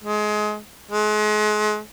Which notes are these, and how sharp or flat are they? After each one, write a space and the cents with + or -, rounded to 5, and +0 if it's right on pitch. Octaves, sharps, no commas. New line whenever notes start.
G#3 +25
G#3 +35